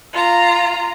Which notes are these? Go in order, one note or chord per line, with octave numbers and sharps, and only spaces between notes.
F4 A#5